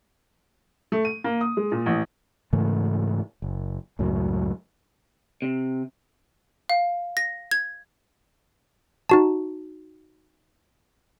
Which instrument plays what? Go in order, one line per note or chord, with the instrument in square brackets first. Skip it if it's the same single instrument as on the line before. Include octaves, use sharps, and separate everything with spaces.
[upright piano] A3
D#7
A#3
D#6
G#3
A#2
A1
[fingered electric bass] G#2 C#3 E3 A3
F#1
C#2 F#2 A2 F#3
[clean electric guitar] C3
[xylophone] F5
A#6
G#6
[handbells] D#4 F#4 A5